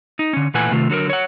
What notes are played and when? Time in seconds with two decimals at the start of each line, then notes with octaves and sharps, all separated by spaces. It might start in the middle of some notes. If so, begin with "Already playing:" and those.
0.19 D#4
0.33 D3 C#4
0.54 A#2 E3 A3 B4 F#5 G#5
0.71 C3 D#3 A3 F4
0.90 D3 F#3 A4 A#4
1.09 C#5 F#5